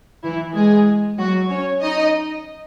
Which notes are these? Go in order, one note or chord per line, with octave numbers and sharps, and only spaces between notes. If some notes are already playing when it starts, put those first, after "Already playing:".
E3 E4
G#3 G#4
F#3 F#4
C#4 C#5
D#4 D#5